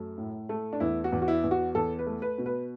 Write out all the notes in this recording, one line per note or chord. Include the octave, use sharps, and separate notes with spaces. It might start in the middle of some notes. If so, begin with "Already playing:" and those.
Already playing: F#2 A3
A2
A3
D4
E2 E4
F#4
E2
F#4
E4
E2
F#4
E2 A4
B4
A3
B4
B2
B4